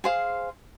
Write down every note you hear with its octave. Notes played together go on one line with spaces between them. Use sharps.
G#4 C5 F5